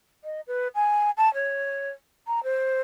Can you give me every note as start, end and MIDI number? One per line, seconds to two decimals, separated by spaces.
0.24 0.41 75
0.47 0.68 71
0.75 1.10 80
1.17 1.32 81
1.34 1.90 73
2.27 2.43 82
2.43 2.82 72